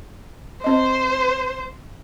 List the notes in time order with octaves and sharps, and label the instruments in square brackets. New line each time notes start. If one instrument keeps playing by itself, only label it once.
[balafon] C4 D#5 [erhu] C5